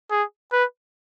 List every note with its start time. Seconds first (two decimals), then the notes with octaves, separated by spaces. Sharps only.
0.11 G#4
0.52 B4